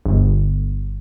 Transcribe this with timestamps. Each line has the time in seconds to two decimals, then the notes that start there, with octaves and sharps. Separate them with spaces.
0.06 G1